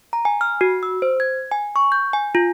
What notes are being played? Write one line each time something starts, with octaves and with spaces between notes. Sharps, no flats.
A#5
G#5
F6
F#4
E6
C5
G#6
G#5
C#6
G6
G#5
F4